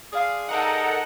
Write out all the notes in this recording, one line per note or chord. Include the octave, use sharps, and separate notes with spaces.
D4 G#4 F5 C6
D#4 A4 A#4 F#5